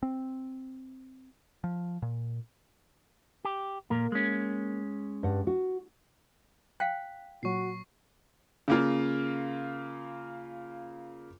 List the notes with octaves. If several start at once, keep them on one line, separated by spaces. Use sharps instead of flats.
C4
F3
A#2
G4
A#2 A#3 A#4
G#3 C#4
G2 F#5
F#4
F5 G5 G#5 F#6 B6
A#2 F#3 F#4 C#6 C7
C#3 A#3 F4